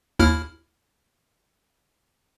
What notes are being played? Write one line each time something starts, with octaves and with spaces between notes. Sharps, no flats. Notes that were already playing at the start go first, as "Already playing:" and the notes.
D#2 E4 F6